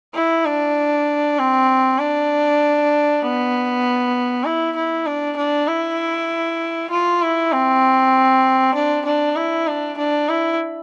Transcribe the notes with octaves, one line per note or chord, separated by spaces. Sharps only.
E4
D4
C4
D4
B3
E4
E4
D4
D4
E4
F4
E4
C4
D4
D4
E4
D4
D4
E4